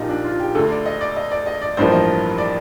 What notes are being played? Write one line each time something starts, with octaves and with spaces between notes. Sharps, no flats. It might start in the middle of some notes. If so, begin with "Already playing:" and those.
Already playing: A#1 A#2 A#3 D#4 F4 G4
D4
F4
G4
D2 D3 A3 A4
D5
D#5
D5
D#5
D5
D#5
D5
A1 G2 F3 A#3 C5
D#5
D5